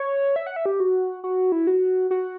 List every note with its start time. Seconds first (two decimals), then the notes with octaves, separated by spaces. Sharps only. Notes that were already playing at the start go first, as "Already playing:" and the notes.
Already playing: C#5
0.36 E5
0.47 F#5
0.56 E5
0.66 G4
0.80 F#4
1.24 F#4
1.52 E4
1.67 F#4
2.11 F#4